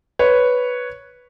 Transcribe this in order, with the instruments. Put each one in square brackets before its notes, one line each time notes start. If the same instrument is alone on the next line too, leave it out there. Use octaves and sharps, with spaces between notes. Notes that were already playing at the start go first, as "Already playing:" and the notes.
[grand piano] B4 C#5